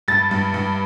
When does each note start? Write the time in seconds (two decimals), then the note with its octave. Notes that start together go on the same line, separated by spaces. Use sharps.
0.08 G2 A6
0.31 G2
0.54 G2